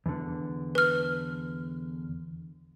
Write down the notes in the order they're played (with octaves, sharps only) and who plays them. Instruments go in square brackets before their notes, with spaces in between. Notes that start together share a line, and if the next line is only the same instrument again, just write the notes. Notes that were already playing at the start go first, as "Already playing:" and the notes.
[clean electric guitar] E2 D3
[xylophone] B4 F6